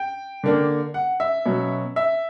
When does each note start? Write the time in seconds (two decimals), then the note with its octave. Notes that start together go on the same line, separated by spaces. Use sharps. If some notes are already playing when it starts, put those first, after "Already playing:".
Already playing: G5
0.44 D3 A#3 D4
0.94 F#5
1.20 E5
1.46 B2 F#3 C#4
1.96 E5